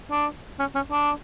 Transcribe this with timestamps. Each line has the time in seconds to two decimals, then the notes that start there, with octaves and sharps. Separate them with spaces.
0.11 D4
0.59 C#4
0.75 C#4
0.91 D4